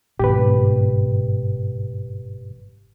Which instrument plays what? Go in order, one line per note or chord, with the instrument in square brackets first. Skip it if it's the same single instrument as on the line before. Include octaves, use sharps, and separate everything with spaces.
[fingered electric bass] G1 G#2 B2 [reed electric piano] G4 B4